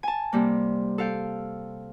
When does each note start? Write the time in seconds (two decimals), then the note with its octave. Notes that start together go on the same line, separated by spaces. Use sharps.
0.03 G#5 A5
0.33 C3 G3 A#3
0.98 A4 F5 G5